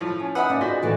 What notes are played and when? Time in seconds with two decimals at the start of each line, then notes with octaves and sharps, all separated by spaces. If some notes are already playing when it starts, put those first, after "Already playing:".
0.01 A2 F3 C#5
0.20 C#4
0.35 B3 D#4 B4 E5 F#5 G#5 D#6
0.50 A#3 C#4 D5
0.61 A#2 D#4 F#4 G#4 C5 B6
0.82 A2 E3 A3